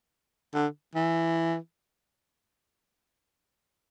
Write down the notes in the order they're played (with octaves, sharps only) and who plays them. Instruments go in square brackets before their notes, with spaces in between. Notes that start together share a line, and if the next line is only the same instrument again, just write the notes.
[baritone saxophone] D3
E3